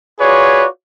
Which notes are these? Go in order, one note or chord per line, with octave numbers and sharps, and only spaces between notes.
F4 F#4 G#4 B4 C#5 D5